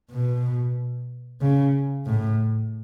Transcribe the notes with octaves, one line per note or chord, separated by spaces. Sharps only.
B2
C#3
A2